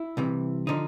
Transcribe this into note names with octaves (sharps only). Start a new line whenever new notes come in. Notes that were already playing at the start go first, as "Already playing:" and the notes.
Already playing: E4
C2 C3 E3
D3 F3 D#4